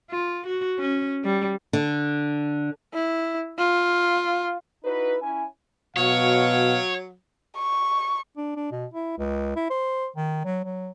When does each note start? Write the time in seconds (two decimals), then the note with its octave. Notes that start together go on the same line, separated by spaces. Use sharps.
0.10 F4
0.46 F#4
0.79 C#4
1.24 G3
1.73 D3
2.93 E4
3.58 F4
4.85 D#4 E4 F#4 B4
5.22 C#4 E4 G#5
5.96 B2 F#3 C#5 F5
7.57 C#6
8.37 D4
8.56 D4
8.72 B2
8.94 E4
9.18 C#2
9.56 E4
9.70 C5
10.16 D#3
10.45 F#3
10.64 F#3